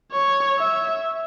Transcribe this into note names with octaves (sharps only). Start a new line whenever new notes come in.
C#5
E5